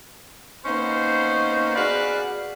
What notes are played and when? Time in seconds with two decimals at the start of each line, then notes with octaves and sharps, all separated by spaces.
0.66 A#3 B3 C#4 D#4 C5
1.76 F#4 G#4 B4 D5 F5